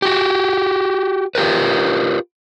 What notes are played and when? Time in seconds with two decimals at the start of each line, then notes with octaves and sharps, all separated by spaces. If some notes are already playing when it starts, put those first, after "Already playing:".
0.02 F#4 G4
1.35 F4 G4 A#4 B4